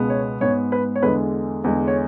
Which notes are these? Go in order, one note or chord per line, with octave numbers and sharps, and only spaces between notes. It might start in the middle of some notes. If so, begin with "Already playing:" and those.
Already playing: C#2 B2 G#3 B3
C#5
G#2 G#3 B3 C#5
B4
C#5
E2 D3 G#3 B4
E2 D3 G#3
C#5